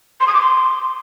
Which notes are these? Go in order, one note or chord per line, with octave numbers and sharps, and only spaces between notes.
C6
D#6
D6
C6